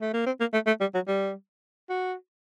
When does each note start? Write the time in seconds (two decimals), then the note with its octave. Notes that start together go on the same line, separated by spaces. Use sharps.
0.01 A3
0.14 A#3
0.26 C4
0.40 A#3
0.54 A3
0.67 A3
0.81 G3
0.94 F#3
1.08 G3
1.90 F#4